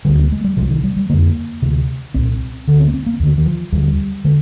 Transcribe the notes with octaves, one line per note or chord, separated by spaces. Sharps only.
D2 D3 G3
A#3
G#3
G3
C2 C3 F3
D#3
G3
G3
F2 D3 A#3
D2 C3
C2 A#2 C4
D2 D3
C4
A#3
C4
A#3
D#2 D3
D#3
F3
D#2 D3 G3
D3 G#3